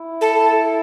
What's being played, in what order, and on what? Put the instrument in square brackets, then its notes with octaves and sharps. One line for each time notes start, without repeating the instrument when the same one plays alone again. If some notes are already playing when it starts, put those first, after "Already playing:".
Already playing: [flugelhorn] E4
[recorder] A4